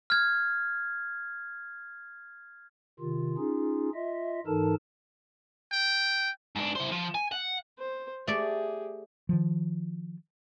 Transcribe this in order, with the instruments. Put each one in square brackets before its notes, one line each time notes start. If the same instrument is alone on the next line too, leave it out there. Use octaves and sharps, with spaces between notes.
[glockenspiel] F6 G#6
[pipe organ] C3 D#3 F4
C#4 D#4 F4 G#4
F4 D#5 E5
G#2 E3 D#4 A4 A#4 A5
[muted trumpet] G5
[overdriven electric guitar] G#2 D4
E4 C5
F3
G#5
F#5
[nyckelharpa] C5
[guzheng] A3 D5 [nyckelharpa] G4 G#4
[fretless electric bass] D#3 F3